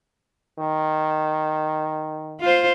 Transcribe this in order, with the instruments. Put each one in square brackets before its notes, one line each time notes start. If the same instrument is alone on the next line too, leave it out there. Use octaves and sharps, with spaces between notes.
[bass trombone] D#3
[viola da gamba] F4 C5